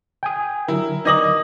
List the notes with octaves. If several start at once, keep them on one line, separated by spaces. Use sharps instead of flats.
G5 G#5 D#6
D3 F#3 E4 A#4
D#4 D5 D6 D#6 A#6 F#7